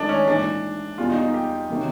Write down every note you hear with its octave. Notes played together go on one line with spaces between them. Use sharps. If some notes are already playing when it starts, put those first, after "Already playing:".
Already playing: G#1 G#2 D#3 F#3 A3 D4 D#4
C#4
A#1 G#2 E3 D4
E2 B2 G3 F4
D#4
D#4
G4
C3 D#3 F#3